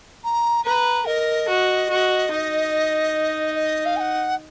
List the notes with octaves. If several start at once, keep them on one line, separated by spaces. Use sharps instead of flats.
A#5
B4 A#5
A#4 D#5
F#4
F#4
D#4
D#5
F5
G#5
F#5